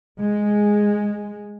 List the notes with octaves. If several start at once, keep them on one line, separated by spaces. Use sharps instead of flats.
G#3